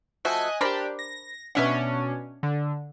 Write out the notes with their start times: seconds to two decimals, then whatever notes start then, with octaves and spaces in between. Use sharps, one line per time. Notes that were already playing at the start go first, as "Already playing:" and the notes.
0.25 F3 A3 F#4 D#5 G#5 F#6
0.61 D4 G4 A#4 C5 B5
0.99 A#6
1.55 B2 C#4 D4 B4 E5 F#5
2.43 D3